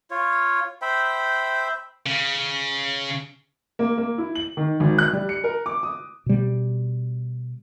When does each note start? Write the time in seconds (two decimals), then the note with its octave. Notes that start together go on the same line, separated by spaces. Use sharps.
0.11 F4 C#5
0.82 C5 E5 G5 B5
2.06 C#3
3.79 A#3
3.98 A#3
4.18 E4
4.35 F#7
4.57 D#3
4.80 G#1
4.98 F#6
5.13 G3
5.29 C#7
5.44 A#4
5.66 D6
5.83 D#6
6.26 B2 G3